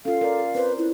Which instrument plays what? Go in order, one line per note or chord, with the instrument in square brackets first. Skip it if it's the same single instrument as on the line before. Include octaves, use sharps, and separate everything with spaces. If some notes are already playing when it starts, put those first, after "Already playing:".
[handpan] C#4 F4 [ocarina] A4 [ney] F5
[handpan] A#4 D5
[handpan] C4 C5 [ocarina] B4
[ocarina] E4 [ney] B4